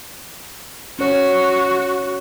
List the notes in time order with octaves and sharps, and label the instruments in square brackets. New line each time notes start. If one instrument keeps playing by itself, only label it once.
[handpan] C#4 C#5 [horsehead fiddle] F#4